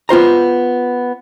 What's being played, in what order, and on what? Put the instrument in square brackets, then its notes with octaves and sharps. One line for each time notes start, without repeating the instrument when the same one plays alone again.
[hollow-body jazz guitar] B3 F4 C5 A#5